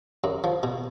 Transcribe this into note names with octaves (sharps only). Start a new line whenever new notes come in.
F#2
F3
B2